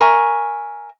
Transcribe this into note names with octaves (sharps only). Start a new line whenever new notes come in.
A#4 E5 G#5 C#6